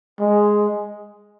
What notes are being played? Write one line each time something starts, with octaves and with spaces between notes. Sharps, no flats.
G#3